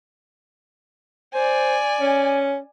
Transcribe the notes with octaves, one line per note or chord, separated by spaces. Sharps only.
C5 D5 G#5
C#4